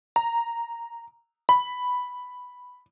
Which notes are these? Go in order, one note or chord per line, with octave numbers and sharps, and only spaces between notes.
A#5
B5